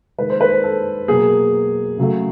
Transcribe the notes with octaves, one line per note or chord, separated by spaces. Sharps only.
D#3 G#3 B4
C5
B4
C5
A4
B2 F#3 A#3 G#4
C#3 F#3 A3